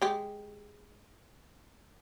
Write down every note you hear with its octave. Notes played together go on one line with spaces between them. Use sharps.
G#3 G4